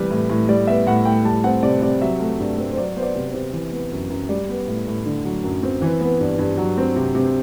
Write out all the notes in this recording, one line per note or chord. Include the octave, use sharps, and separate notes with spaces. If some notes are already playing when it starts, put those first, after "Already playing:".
Already playing: C3 E3 G3 B4
A2
A2
G3 D5
B3 E5
A2 F#5
A2 G5
G3 A5
C4 F#5
C3 D5
C3 D5
F#3 E5
A3
G2
C4
C5
F#3 D5
B3 C5
D5
C3
C5
C3
E3
B3
F#2
F#2
G3 D5
B3
A2
A2
D3
F#3
F#2
C4
E3 B4
B3
G2
G2
F#3
C4
C3
C3